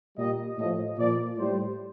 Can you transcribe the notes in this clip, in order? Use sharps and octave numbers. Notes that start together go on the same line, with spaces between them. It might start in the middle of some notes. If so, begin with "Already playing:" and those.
A#2 G3 D#5
A2 F3 D#5
A#2 F3 D5
A2 G3 C5